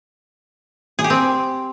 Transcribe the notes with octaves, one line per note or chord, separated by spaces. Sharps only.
G#4
G4
C4